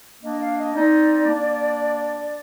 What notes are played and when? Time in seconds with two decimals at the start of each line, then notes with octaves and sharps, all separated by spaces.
0.24 A#3 D4 D#5
0.41 F5
0.58 D#5
0.75 C4 D#4 D5
1.26 A#3 D4